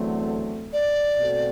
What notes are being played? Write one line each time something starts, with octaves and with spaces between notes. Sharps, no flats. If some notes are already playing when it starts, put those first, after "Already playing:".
Already playing: E2 D3 F#3 A3 C4
D5
B2 A3 C4 F#4 A4